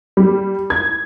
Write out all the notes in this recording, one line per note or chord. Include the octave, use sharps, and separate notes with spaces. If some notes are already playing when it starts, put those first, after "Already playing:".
G3
G#6